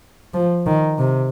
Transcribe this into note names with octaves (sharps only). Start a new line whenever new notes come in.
F3
D#3
C3